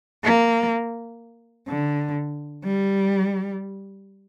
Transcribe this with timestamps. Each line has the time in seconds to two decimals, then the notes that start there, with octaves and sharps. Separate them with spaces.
0.24 A#3
1.68 D3
2.64 G3